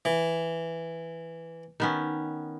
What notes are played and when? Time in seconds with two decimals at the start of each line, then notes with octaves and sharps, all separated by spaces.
0.05 E3
1.80 D#3 B3 C#4